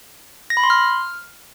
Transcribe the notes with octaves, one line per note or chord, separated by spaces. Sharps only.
A#6
B5
C6
F6